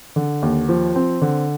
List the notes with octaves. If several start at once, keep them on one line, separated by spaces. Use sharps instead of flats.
D3
D#2
F3
C4
D3